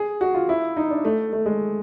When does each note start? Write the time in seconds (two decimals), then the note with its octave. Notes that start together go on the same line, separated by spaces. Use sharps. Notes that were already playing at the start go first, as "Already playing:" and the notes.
Already playing: G#4
0.21 F#4
0.34 F4
0.49 E4
0.77 D#4
0.90 D4
1.05 A3
1.33 A3
1.46 G#3